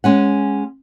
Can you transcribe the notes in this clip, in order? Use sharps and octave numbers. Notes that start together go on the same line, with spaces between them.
G#3 C#4 F#5